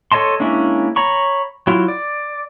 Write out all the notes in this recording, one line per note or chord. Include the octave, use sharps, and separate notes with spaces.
A4 C#5 D#5 A5 C6
G#3 A#3 C#4 D4 E4
C#5 A#5 B5 C#6
F#3 E4 F4
D5